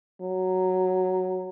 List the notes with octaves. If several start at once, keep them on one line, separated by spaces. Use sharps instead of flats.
F#3